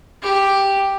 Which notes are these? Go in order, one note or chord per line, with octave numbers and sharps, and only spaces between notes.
G4